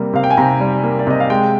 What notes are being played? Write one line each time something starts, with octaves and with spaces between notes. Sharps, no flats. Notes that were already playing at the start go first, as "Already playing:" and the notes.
Already playing: C3 G3 A#3
C3 F5
G5
G#5
C3 A#5
G3
A#3
D5
C3 D#5
F5
G#3 G5